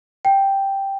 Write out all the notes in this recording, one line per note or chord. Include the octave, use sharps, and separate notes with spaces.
G5